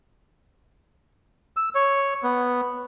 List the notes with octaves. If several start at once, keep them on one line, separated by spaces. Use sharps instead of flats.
E6
C#5
B3